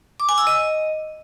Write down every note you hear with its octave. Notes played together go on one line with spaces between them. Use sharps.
D6
G#5
E6
D#5